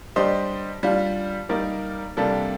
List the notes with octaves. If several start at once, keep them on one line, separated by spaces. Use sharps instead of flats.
G3 D4 G4 C5 D#5
G3 D4 F4
G3 A#3 D#4 A#4 D5
C3 G3 A#3 D4 A4